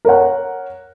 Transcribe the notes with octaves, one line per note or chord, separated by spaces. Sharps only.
A#4 C#5 F#5